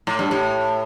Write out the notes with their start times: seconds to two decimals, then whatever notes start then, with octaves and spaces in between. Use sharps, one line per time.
0.07 A2
0.19 G2
0.31 A2